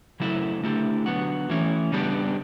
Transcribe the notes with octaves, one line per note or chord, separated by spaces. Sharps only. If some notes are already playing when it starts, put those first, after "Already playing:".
C#3 F#3 A3 E4
D3 A3 E4 G4
D3 F#3 B3 F#4
E3 A3 C#4 E4
C#3 G3 B3 D4 G4